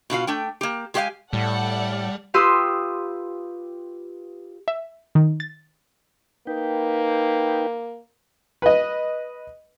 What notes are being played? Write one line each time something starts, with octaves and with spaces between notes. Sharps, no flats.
B2 F4 F#4 F5
A3 D4 G5
A#3 G4
G#3 G4 C5 D5 F5 G#5
A2 G3 A4 D5 F#5
F4 G4 B4 C6 D#6 E6
E5
D#3
A6
A#3 D#4 B4 G5
B4 D#5